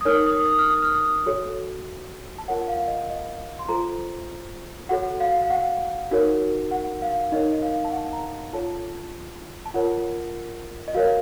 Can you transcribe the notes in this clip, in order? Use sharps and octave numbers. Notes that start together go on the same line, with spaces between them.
D#6
D#4 A#4 C#5 F6
D#6
D#6
F6
D#6
F6
D#6
F#4 A4 C#5
A5
F4 A#4 C#5 F#5
F5
D#5
D#5
C6
F4 A4 C5 A#5
F#4 A4 C#5 F#5
F5
F5
F#5
D#4 F#4 A#4 C#5
F#5
F5
D#4 A#4 C#5 D#5
D#5
F5
A5
F#5
A#5
F4 A4 C#5 A5
A5
F4 A#4 C#5 F#5
D#5
F#4 A#4 C#5 F5